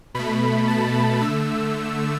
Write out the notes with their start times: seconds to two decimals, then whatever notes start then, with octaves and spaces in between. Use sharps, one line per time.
0.14 B2 A3 B5
0.68 A5
1.21 D3 A3 E6